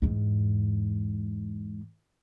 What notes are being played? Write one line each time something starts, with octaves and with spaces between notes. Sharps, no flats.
E2 G#2